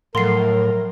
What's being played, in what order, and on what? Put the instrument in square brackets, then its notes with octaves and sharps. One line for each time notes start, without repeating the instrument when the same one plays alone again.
[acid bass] A2 [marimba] F3 F#3 A4 [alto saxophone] A#4 [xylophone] C6 C7